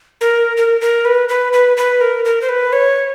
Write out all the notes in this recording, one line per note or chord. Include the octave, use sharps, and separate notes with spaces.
A#4
A#4
A#4
B4
B4
B4
B4
A#4
A#4
C5
B4
C#5